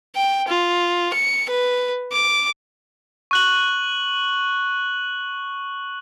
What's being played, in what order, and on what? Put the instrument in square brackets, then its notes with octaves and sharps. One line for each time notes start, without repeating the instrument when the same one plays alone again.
[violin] G5
F4
C#7
B4
D6
[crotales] C#6 F#6 F#7